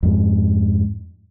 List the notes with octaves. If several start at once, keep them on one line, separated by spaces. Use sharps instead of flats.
F2 G#2